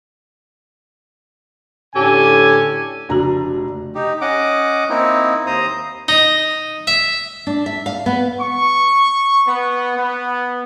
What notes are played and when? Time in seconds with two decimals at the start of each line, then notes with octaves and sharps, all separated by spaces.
1.94 A2 D3 C#4 G4 A4 G#5
3.09 F1 C#3 D4 F#4 A#5
3.95 D#4 G4
4.21 C#4 D#5 F#5 D6
4.90 A#3 C4 D#4 E4
5.46 D#2 C5 A#5 D#6
6.08 D#4
6.87 E5
7.47 D4
7.66 E5
7.86 F5
8.06 B3
8.41 C#6
9.46 B3
9.96 B3